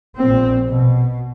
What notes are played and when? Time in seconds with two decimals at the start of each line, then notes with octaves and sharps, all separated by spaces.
0.18 A#1 C4
0.69 B2